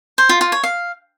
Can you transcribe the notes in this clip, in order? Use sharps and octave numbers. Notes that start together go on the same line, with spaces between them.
C5
F4
F4
C#5
F5